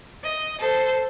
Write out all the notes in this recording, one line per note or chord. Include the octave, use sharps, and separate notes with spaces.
D#5
A4 C5